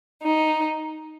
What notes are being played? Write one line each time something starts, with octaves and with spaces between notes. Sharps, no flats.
D#4